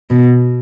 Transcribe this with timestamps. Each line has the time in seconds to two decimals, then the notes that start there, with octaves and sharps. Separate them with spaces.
0.10 B2